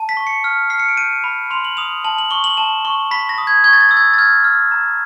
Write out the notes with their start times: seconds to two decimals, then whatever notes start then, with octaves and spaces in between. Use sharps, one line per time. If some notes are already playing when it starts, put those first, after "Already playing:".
Already playing: A5
0.09 B6
0.17 C#6
0.27 C#7
0.44 F6
0.70 F6 C7
0.80 C#7
0.89 D7
0.97 G6 D#7
1.24 B5
1.50 C6 F7
1.65 F#7
1.77 D#6 F7
2.04 A5 F#7
2.18 F#7
2.31 C#6 G7
2.44 F#7
2.57 A5 E7
2.85 C#6
3.11 B5 B6
3.29 A#6
3.38 D#6
3.47 G#6
3.64 C#6 G#6
3.73 A6
3.81 G#6
3.89 E6 A6
3.97 G#6
4.14 A6
4.18 F6 G#6
4.44 F6
4.71 A#5